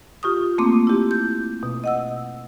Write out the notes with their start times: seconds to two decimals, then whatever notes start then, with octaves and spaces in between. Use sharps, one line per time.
0.23 F4 G4 C#6 D#6
0.58 A3 A#3 C4 C6 D6
0.87 E4 G4
1.11 G6
1.63 B2
1.84 D#5 F#5 E6